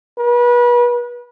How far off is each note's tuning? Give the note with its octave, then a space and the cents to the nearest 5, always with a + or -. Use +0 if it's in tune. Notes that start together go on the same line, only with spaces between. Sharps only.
B4 -35